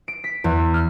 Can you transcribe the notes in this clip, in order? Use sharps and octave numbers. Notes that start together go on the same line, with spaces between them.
D7
B6
E2
F6